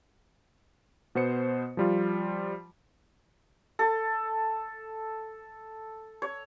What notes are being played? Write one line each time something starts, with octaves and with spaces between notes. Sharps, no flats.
B2 B3 C5 C#7
F3 G3 F4
A4
C#5